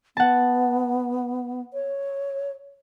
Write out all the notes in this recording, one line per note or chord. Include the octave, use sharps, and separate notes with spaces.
B3 F#5 A5
C#5